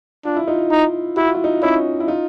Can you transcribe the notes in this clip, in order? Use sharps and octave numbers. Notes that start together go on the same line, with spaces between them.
D4 F4
E4
D#4 F4
D#4
E4 F#4
F4
E4
D#4 F4
C#4 D#4 E4
E4
D#4 F4